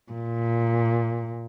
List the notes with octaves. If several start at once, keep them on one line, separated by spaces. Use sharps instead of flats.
A#2